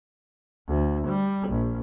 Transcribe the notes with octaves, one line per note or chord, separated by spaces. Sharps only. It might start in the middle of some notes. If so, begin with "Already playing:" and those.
D2
G3
A#1